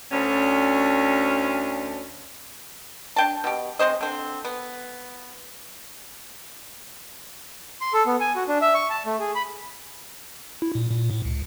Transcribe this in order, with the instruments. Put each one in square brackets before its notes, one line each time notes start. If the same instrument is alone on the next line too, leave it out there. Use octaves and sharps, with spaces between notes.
[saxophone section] D2 C#4
[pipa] D4 G5 A5
B2 G4
G#3 C4 C5 D#5
D3 C4
B3
[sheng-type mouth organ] C6
A4
B3
G#5
F#4
D4
E5
C#6
A5
A3
G#4
B5
[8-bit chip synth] E4
A#2
A#2
A2
C#2